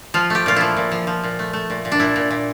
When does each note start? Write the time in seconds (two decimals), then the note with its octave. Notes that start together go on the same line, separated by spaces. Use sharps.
0.14 F3 F4
0.30 A3 G4
0.46 A#2 F4
0.56 F3 E4
0.77 A#2
0.92 F3
1.07 F3
1.24 A#2
1.39 A3
1.53 A3
1.70 A#2
1.85 A#2
1.92 D4
2.00 A#2 E4
2.16 A#2
2.31 A#2